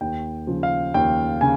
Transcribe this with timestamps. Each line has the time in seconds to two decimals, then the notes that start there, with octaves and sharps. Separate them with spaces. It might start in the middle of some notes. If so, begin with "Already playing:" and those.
0.01 D#2 G5
0.47 C#3 F3
0.63 F5
0.94 D#2 G5
1.41 C#3 G#5